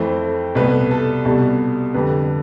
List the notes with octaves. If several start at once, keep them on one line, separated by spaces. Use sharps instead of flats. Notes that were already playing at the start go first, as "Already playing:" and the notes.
Already playing: F2 E3 A3 C5
C2 B2 A3 B4
A4
C2 B2 G3 A4
F2 D3 G3 B4